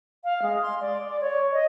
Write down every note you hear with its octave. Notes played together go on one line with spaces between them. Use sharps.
F5
G#3
C6
D5
D5
C#5
D#5